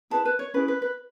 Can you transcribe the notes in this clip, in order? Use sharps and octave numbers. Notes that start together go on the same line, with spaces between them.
E4 G#4 B4 A5
B4
C#5
C#4 E4 G#4 B4
B4
B4